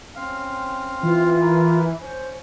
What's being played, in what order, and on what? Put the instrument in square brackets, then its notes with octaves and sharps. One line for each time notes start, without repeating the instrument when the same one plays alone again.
[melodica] C4 F5 [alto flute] C#4
[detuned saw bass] E3 [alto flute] F4
[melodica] A#4 B4
[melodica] C#4 [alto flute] C5